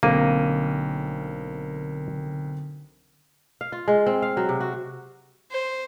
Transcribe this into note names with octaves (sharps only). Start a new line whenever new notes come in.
B1 D3 A#3 C4 A#4 D#7
F5
F4
G#3
C4
F5
F#3
C3
F#4
C5